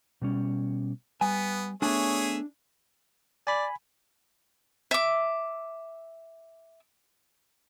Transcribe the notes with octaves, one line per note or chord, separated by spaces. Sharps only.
B2 G3 C#4
G3 B3 G#5
A3 B3 D4 G#4 C#5 E5 G#5
D5 G#5 B5
E5 D6